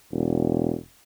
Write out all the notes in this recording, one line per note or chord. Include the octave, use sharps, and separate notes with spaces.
E1